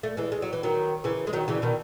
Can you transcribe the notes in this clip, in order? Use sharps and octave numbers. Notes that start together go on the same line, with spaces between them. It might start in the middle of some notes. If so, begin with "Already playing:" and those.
A3
E3 G#3
G#3
F#3
E3
D#3 F#3
C#3 E3
G#3
D#3 F#3
C#3 E3
B2 D#3